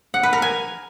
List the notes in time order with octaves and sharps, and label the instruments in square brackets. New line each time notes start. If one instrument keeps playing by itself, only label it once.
[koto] F#5
B4
A#4
G#5